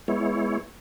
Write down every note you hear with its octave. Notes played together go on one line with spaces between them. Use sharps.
G#3 B3 E4 C#5